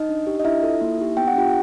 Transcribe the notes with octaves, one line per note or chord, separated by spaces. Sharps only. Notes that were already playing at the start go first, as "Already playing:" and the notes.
Already playing: D#4 D#5
D4
G4
D#5
D4 E4 E5
F4 A4
A#3
D#4 G4
B3 G5
F#5
D4 F4 G4 G5